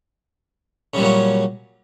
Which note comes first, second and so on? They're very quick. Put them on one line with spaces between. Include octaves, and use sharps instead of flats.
C#3 G3 A#2 F#3 C#4